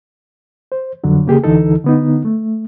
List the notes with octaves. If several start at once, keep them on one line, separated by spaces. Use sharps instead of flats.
C5
F2 D3 F#3
C#3 A#3 G4 G#4
D2 D3 E3 D#4 A4
D3 B3 D#4
A3